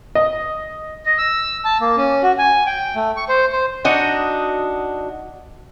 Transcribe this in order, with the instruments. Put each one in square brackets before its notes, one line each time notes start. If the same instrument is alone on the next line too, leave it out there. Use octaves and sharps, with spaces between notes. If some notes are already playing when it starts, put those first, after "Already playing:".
[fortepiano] D#5
[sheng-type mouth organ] D#5
E6
A5
A#3
C#4
F#4
G#5
G5
A3
C#6
C5
C5
[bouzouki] D4 D#4 F#4 D#5